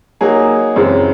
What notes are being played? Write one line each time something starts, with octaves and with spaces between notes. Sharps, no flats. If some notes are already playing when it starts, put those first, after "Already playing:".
F#3 A#3 D#4 G#4
F#2 C#3 E3 G#3 C4